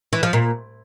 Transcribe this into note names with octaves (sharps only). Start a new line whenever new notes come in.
E3
F3
A#2